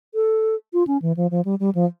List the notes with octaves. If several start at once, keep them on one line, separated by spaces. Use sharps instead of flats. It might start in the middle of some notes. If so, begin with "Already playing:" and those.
A4
F4
C#4
E3
F3
F3
G3
G3
F3